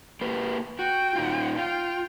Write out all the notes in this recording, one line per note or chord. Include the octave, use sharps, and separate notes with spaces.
A#3 G4 B4
F#4 G5
A#2 D#4 F4
F4 G5